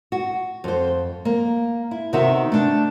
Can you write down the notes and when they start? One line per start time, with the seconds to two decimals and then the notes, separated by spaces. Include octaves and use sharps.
0.12 F#4
0.64 F2 C5
1.25 A#3
1.91 E4
2.13 C3 D#3 B3 D#4 F#4 E5
2.52 A3 D4